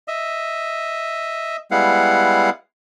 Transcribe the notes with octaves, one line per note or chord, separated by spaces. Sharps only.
D#5 E5
G3 G#3 B3 E4 F5 F#5